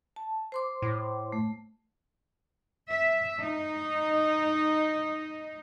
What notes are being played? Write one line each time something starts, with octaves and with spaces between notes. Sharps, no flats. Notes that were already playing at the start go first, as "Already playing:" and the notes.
A5
C5 C6 D6
A2
A3
E5
D#4